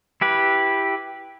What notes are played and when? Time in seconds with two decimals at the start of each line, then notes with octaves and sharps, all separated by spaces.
0.21 E4 G4 B4